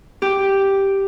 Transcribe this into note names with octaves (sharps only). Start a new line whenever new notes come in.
G4